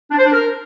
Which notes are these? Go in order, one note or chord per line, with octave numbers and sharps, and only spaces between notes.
D4
C5
D4
A#4